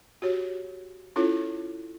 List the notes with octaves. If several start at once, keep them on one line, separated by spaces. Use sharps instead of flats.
F#4 G4 C#5
C#4 E4 F4 A4 C#5